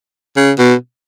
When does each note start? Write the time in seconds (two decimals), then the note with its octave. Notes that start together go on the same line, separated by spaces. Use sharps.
0.37 C#3
0.58 B2